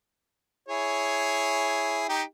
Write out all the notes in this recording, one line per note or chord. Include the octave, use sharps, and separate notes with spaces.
E4 G#4 C#5
D#4 G4